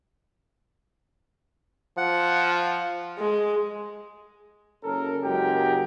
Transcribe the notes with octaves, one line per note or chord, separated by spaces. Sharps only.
F3 F#5
G#3
F#1 C#4 A4 A#4
F#1 F#3 G#3 G4 A#4 G5